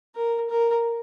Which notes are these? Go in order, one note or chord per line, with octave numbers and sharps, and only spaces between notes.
A#4
A#4